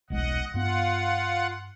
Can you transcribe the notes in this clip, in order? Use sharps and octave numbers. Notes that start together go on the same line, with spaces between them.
D#1 B1 G#3 D#5 F#5
G2 B3 F4 F#5